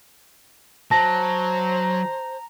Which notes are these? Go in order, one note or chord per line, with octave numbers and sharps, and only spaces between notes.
F#3 C5 A5 A#5 A#6